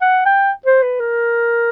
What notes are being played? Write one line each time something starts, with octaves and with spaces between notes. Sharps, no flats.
F#5
G5
C5
B4
A#4